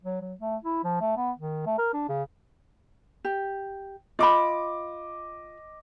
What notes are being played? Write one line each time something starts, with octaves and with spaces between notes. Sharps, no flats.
F#3
F#3
A3
E4
F3
A3
B3
D#3
A3
A#4
D4
C#3
G4
F4 D#5 B5 D6